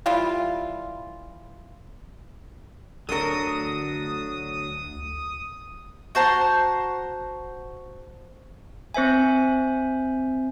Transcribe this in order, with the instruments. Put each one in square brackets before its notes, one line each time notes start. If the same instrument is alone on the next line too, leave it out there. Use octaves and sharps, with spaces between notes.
[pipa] E3 G3 F4 F5
[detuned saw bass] D2 [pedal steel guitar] F#3 D4 F#4 [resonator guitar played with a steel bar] A4 A#4 [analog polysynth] D#6
[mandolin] F#4 C5 A5 A#5
[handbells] C4 C5 E5 G#5